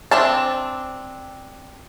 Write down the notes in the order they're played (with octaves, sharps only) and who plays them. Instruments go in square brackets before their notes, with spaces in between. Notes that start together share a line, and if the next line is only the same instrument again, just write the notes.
[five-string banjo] C4 D4 E5 A5